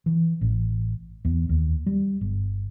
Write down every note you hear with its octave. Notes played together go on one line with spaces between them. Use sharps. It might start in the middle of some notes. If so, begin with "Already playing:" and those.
E3
A1
E2
D#2
G3
G1